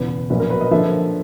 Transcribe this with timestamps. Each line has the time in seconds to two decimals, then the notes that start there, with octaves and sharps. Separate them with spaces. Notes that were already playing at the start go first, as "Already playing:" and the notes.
Already playing: F#1 E2 B2 B4
0.30 A#1 A#2 F#3 B3 B4
0.40 A#4
0.50 B4
0.61 D#5
0.71 D3 F3 A#3 E5